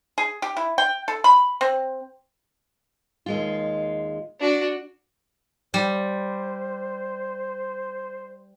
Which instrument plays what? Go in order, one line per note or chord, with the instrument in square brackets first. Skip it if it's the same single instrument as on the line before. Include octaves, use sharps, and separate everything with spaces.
[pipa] G#4
G4
E4
G5
A4
B5
C4
[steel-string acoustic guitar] D#2 G#3 F4
[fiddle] D4 F#4
[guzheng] G3 [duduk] C5